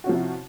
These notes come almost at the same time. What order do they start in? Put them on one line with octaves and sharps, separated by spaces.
F#4 C#4 F3 C3 E4